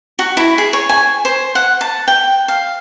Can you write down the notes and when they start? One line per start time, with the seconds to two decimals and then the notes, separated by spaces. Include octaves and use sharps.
0.19 F#4
0.37 E4
0.58 G#4
0.73 C#5
0.89 G#5
1.25 C5
1.55 F#5
1.81 A5
2.08 G5
2.48 F5